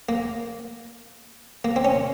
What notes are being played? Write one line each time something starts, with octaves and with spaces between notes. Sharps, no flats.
A#3
A#3
C4
C#4